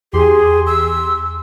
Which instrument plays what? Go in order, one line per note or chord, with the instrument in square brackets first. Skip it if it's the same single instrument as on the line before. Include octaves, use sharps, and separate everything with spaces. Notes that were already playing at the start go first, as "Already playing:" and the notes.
[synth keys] E2 G4 C6 [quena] G#4
[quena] E6